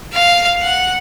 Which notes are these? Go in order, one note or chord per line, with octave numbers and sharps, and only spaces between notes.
F5
F#5